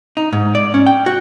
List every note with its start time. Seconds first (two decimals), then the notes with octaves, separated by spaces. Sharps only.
0.17 D#4
0.33 G#2
0.55 D5
0.74 C#4
0.86 G5
1.06 F#4